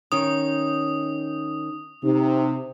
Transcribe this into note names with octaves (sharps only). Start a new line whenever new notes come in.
D#3 C#4 D#4 D#6
C3 D#4